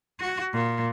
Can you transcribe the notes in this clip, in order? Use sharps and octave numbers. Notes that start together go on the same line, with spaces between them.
F#4
A#2